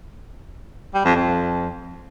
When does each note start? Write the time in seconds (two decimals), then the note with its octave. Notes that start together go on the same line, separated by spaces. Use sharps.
0.94 G3
1.05 F2
1.16 F2